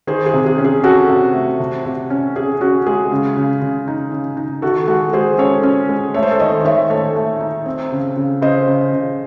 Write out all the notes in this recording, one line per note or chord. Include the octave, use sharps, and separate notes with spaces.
D#3 G#4 C5
G#4
C3
G#4
C#4
G#4
C#4 F#4 A4
C3
A3
C3
C3
C#4
C#4 G#4
C#4 F#4
G#3 G#4
C#3
C#3
C#3
D#4
C#3
D#4
D#3 F#4 A4
G#3 F#4 A4
G#3 G#4 C5
C#4 A4 C#5
C#4
G#3
A3 C#5
C5
A4 C#5
D#3 C5 D#5
D#3 C#5 E5
A3 A4 C#5
A3
D#4
C4
C#3
C#3
C#3 C5 D#5
C#3
C#3